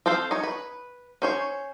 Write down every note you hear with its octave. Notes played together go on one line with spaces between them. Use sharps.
C4 A4 C5 F5
D#4 C#5
B4
C#4 C5 C#5